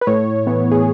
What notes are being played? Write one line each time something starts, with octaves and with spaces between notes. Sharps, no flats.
B4
A2 C#5
E3 B3
G#4